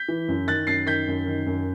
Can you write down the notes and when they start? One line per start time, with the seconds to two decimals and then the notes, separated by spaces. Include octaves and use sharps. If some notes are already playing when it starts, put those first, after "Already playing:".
Already playing: G6 B6
0.08 E3
0.28 F#2
0.48 D#3 F#6 A6
0.67 F#2 A6 C7
0.87 D#3 G6 B6
1.07 F#2
1.27 D#3
1.46 F#2